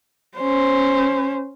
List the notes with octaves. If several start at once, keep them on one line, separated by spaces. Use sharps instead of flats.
C#4 C5